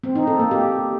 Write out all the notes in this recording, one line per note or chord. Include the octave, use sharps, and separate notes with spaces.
C4
D#4
A4
A#3
G4